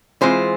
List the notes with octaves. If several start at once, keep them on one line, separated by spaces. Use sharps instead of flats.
E3 G#3 C4 F4 C5